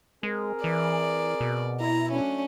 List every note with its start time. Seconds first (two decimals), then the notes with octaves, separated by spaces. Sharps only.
0.23 G#3 C4 G#4 A#4
0.64 E3 D5
1.40 B2
1.80 E4 A#5
2.12 F#3 A3 C#4 D4